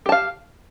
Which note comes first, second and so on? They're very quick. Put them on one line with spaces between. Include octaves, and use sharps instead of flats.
G4 A5 F5